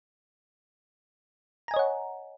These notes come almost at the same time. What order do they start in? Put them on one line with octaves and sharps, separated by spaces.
A#5 G#5 D#5 C#5 F#5